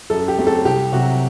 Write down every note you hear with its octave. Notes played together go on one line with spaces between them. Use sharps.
F#2 A4
G4
F#3 A3 C4
A4
C2 G4
C3 F#3 F#4